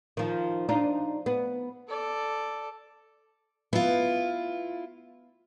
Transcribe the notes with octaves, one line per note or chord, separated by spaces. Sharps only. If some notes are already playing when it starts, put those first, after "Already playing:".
D#3 F3
D4 D#4 F4
B3
A4 D5
B3 E4 F4